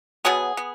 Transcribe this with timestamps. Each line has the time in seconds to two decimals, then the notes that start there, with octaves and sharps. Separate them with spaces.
0.25 B2 F#3 B3 G#4
0.57 B3